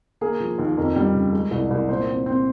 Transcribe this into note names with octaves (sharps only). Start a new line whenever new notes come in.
A#3 G#4
F3
D#2
F2 A#4
G3
C#3
G#3
C2
C2
A#2 C5
C4
C4